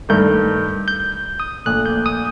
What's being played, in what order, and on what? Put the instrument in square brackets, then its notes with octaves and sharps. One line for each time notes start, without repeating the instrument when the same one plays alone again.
[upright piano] G2 D#3 A3 [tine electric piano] G6
[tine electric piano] G6
D#6
[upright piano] A#1 A#2 A3 [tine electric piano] F#6
[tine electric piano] G6
D#6